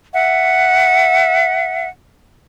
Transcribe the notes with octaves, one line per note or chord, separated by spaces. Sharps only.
E5 F#5